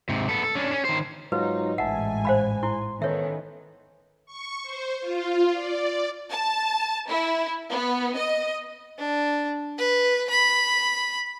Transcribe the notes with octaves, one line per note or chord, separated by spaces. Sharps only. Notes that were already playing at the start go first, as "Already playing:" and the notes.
G#2 C3
B3 A4
A4
C#4 D4
C#4
D#3 C5
G#2 F#3 D#4 F4 B4
A1 G#2 E5 F#5 G#5 A5
C5 F5 B5
E4 C6
D#3 B3 C#4 A4 C#5 E5
C#6
C5
F4
D5
A5
E4
B3
D#5
D4
B4
B5